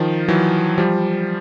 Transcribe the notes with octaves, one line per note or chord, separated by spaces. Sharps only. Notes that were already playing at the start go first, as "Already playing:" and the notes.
Already playing: D#3 F3
E3 F#3
F3 G3